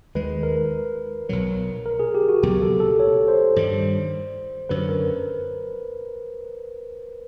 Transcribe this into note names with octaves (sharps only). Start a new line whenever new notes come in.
D#2 D#3 G#3 B4
A#4
B1 B2 F#3
A#4
G#4
G4
F#4
C#2 B2 F#3 A#3 G4
A4
A4
C#5
C5
G2 D#3 G3
F#2 D3 F#3 B4
A#4